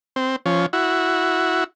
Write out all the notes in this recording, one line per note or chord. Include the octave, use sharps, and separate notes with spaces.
C4
F3 C#4
E4 F#4